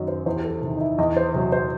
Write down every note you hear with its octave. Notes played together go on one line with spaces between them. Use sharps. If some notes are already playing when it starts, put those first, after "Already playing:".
Already playing: F#2 D#3 F#3 D#5
C5
E2 C5
G4
A4
C3 D#3
D#4
E4
E2 D#5
C5
C3 F#3
C5